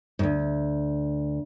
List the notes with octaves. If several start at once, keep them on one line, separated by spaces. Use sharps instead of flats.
D2 G#2